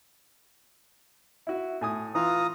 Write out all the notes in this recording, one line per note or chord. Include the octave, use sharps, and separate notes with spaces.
E4 F#4
A2 G#5 D#6
E3 F4 A#5 D#6